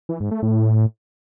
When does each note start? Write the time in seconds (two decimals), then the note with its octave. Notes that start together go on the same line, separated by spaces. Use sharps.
0.09 E3
0.20 G#2
0.31 A3
0.42 A2